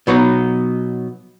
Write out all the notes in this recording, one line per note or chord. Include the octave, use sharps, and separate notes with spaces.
B2 F#3 B3 D#4